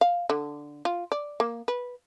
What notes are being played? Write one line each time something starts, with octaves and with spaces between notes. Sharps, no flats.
F5
D3
F4
D5
A#3
B4